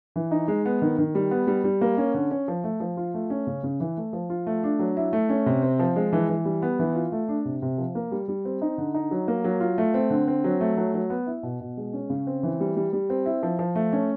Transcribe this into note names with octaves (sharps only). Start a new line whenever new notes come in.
E3
D#4
G#3
B3
D#3
D#3
G3
B3
G3
G3
A#3
C#4
D3
C#4
F3
A3
F3
F4
A3
C#4
C#3
C#3
E3
A3
F3
F4
A3
D4
F#3
E4
A3
C#4
C3
C4
F3
G#3
E3
E3
G3
B3
E3
F4
A3
D4
C3
C3
F3
A#3
G3
G3
C4
D#4
D3
D#4
F#3
A#3
F#3
F4
A3
C4
D3
C4
F#3
A3
F#3
F#3
B3
E4
B2
B2
G#3
C#4
C#3
C4
E3
G3
G3
G3
C4
E4
F3
F3
A3
C#4